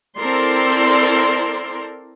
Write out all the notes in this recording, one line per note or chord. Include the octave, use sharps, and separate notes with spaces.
C4 E4 A4 A#4 D5 C6